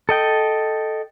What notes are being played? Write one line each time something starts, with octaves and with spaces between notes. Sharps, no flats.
A4 D#5 G5